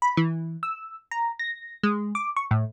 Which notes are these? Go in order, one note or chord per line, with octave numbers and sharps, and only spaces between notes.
B5
E3
E6
A#5
A#6
G#3
D6
C#6
A2